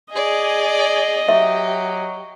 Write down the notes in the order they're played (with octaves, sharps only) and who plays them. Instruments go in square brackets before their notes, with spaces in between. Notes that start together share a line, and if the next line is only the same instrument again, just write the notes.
[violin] G#4 D5 [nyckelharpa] D#5 [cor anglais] G#5
[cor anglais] F#3 [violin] G4 [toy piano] E5